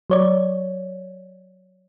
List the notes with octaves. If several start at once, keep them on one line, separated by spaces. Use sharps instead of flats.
F#3 C#5 D5